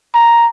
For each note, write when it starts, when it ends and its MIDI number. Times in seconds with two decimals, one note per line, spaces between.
0.15 0.47 82